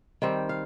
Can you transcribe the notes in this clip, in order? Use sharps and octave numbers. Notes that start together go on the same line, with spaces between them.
D#3 G3 C4 G5
F5